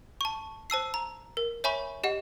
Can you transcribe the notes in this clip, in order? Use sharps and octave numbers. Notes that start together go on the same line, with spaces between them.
A5 C#6
C5 A5 E6 C7
A#5
A#4
C#5 E5 G#5 B5 C#6
G4 D#5 F#5